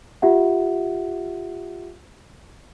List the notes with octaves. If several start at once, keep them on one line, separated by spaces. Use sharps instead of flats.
F4 G4 E5 F#5